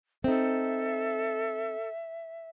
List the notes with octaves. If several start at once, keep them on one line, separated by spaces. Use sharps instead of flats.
C4 D#4 A4 E5